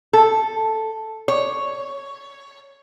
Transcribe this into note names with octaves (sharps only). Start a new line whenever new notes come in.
A4
C#5